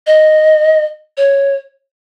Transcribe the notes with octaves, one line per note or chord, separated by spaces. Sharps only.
D#5
C#5